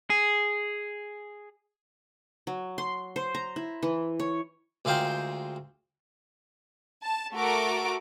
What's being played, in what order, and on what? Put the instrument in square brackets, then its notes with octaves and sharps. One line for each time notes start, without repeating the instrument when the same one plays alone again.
[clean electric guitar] G#4
[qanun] F#3
C6
C5
A#5
E4
E3
C#5
[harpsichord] D2 G#3 F4 A#4 C5 G5
[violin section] A5
A3 F#4 A4 A#4 D6 D7